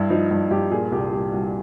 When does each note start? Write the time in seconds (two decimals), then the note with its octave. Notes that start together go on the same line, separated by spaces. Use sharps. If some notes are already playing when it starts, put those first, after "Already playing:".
Already playing: G2 E4
0.10 F3 D#4
0.31 G2
0.51 G2 G4
0.71 A#2 G#4
0.92 C2 G4
1.13 C2 G4
1.33 C2 F#4